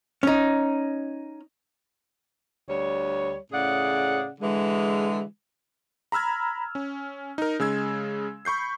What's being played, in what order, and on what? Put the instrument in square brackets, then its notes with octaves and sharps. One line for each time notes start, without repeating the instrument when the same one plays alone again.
[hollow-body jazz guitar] C#4 D#4
[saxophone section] D2 G3 C#5
A2 C#3 G#4 D5 F#5
D3 E3 G#3
[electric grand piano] A#5 B5 E6 F6 G#6
C#4
D#4 A#4
C#3 G#3 E6 G#6
B5 C#6 G6 C7